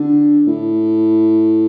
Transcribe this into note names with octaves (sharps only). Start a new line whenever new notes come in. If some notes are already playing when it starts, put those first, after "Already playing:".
Already playing: D3
A2